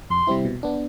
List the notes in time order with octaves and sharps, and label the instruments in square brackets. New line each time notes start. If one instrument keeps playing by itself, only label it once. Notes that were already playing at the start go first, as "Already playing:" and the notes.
[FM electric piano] F2 [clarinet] C6
[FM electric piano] C3 G3 C4 E4
B2
B3 D4